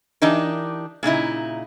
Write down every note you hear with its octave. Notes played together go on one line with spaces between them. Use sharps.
E3 D4 D#4 G4 A#4
A#2 C#3 D#4 E4